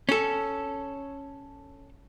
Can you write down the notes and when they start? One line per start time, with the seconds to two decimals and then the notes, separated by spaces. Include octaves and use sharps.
0.09 C#4 A4